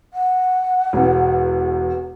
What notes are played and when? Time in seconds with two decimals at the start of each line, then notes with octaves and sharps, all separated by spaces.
0.13 F#5
0.93 E1 E2